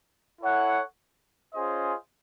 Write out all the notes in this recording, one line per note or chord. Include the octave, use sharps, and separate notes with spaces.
E4 A4 C#5 F#5
C#4 F4 G#4 C5 D#5